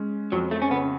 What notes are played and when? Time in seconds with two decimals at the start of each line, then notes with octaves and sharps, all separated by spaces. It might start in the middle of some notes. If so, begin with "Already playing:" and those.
Already playing: G#3 C#4
0.32 F2 F#3
0.51 A3
0.62 C#4
0.70 C#3 B3